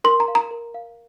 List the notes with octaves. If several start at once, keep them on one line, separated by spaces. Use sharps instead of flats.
A#4 C6
A#5
F5
A#5
A#4
F5